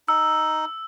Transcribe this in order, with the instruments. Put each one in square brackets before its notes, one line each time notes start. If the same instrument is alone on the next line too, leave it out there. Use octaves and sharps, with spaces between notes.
[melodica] D#4 [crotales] E6